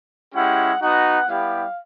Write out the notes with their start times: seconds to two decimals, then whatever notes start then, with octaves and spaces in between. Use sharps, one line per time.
0.34 G#3 C#4 E4 G4 F#5
0.81 B3 D#4 F#4 F#5
1.28 G3 B3 E4 G4 F5